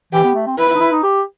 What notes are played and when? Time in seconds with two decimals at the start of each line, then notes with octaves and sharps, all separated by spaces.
0.13 E3 G4
0.24 B3
0.35 A3
0.47 C4
0.58 E4 B4
0.69 E4
0.75 D#4
0.80 E4
0.91 D#4
1.03 G4